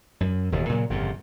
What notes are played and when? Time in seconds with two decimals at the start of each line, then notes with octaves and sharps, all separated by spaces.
0.21 F#2
0.52 E1 D#2 A2
0.69 A#2 C#3 F#3
0.89 G1 F2 A#2 C#3